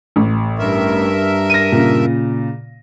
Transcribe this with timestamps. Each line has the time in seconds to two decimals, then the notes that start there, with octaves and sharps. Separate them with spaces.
0.16 A1
0.59 G2 A#4 E5
1.50 A#6 D#7
1.72 A#2 C#3